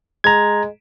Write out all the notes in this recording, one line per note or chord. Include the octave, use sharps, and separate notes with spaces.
G#3 A#5 G#6